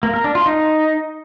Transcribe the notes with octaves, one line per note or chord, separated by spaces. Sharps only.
A#3
A#4
D4
F4
D#4